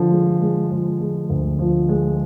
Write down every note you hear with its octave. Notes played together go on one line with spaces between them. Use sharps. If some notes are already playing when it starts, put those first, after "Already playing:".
Already playing: D3 F3
G#3
G#3
F3
G#3
D2
F3
G#3